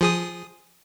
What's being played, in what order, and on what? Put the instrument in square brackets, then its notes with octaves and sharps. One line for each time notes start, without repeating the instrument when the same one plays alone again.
[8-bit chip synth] F3 G#4 D#6